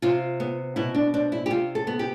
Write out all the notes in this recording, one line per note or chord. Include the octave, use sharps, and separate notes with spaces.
C3 F4
B3
B2 E4
D4
C4 D4
E4
G4
C3 F4
A4
B3
G4